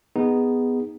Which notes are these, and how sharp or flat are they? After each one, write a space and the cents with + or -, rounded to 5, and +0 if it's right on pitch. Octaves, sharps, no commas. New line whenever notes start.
B3 +5 D#4 +0 G#4 -15